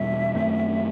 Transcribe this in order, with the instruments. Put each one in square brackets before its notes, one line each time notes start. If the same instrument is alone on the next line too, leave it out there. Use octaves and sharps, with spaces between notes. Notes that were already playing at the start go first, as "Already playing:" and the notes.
Already playing: [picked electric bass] E2 B2 G3 [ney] E5
[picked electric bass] F#2 D#3 A3 C4